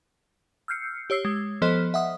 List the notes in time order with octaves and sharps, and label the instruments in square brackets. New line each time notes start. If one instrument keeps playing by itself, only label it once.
[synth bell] E6 F6 G6 C7 C#7
G4 C#5 E6 C7
G#3
F3 B3 A4 C5 D#5 B6
E5 F#5 D#6